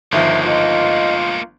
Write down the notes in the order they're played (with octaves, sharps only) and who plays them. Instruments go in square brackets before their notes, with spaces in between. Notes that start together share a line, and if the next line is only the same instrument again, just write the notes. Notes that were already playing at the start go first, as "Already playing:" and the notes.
[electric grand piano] G1 D#3 F3 [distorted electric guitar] G#3 A#3 [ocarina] E5
[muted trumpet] F4 [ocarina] D#5